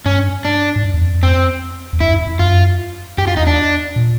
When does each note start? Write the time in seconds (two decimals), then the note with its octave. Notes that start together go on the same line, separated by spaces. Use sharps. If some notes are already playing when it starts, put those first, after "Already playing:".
0.05 G2 C#4
0.45 D4
0.76 G#2
0.84 G2
0.94 E2
1.03 F2
1.23 C4
1.93 E2
2.00 F2 E4
2.14 F#2
2.27 F2
2.39 F#2 F4
3.18 F#2 G4
3.27 F4
3.37 E2 D#4
3.47 D4
3.96 A#2